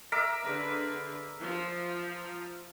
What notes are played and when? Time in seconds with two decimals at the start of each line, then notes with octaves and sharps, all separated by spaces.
0.12 A#4 E5 D6
0.43 D3 G#4 B4
1.40 F3